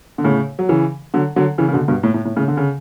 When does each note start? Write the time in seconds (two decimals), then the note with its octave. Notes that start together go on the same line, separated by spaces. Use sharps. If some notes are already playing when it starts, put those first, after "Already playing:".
0.18 D3
0.24 A2 C#3
0.59 F#3
0.69 C#3 E3
1.14 D3 F#3
1.36 D3 F#3
1.58 C#3 E3
1.68 C#3
1.73 B2 D3
1.88 G2 B2
2.03 A2
2.14 A2
2.25 A2
2.36 A2 C#3
2.48 D3
2.57 C#3